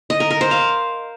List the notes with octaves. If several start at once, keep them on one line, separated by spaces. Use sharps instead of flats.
D#5
A#4
A#4
C5
F5